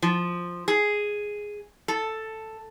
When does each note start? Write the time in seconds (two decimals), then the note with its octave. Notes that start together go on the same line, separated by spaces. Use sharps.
0.02 F3
0.68 G#4
1.88 A4